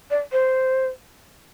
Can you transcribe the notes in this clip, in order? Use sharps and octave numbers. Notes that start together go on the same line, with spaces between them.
D5
C5